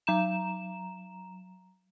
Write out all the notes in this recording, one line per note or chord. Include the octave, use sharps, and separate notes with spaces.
F#3 A#5 E7